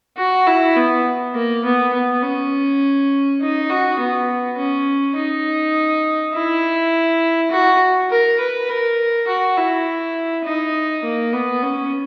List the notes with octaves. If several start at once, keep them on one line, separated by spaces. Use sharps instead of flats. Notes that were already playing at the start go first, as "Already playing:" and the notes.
F#4
E4
B3
A#3
B3
B3
C#4
D#4
F#4
B3
C#4
D#4
E4
F#4
A#4
B4
A#4
F#4
E4
D#4
A#3
B3
C#4